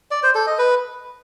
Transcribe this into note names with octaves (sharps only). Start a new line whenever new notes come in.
D5
C5
A4
D#5
B4